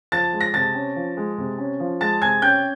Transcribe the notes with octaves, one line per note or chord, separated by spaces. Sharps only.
F3 A5 A6
G#3
A#6
C3 A5 A6
C#4
F3
G#3
C3
C#4
F3
G#3 A5 A6
C3 G#5 G#6
C#4 G5 G6